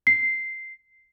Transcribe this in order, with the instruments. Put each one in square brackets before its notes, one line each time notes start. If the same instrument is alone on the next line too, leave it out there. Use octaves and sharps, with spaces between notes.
[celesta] C7